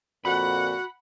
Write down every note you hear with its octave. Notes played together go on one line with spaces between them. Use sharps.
F2 A#2 F#4 F#5 B5